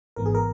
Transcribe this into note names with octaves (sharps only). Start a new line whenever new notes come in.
G#1 G#2 E3 B3 A#4
G#4
A#4